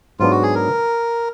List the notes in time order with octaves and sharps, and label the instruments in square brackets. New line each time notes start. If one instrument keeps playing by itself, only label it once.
[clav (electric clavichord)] G#2 F#3 B3 D4 [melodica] F4
[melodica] F#4
G#4
A#4